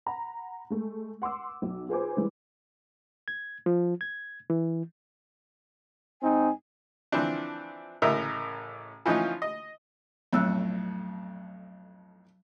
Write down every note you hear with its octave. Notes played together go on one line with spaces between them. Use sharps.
F#5 A#5 B5
G#3 A3
F#5 C6 D6 E6
B1
F4 G#4 B4 C5 G#5 D6
E3 G3 G#3
G#6
F3
G#6
E3
G#2 C4 D#4 G#5
E3 F3 C4 D4
A1 A2 C#3 A#4 D#5 E5
E3 F3 C#4 D#4 F4
D#5
B1 F2 A2 F#3 E6 F#6